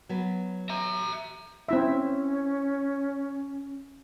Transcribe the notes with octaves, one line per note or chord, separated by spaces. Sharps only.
F#3 B3 B4
E5 A#5
C4 C#4 E4 E5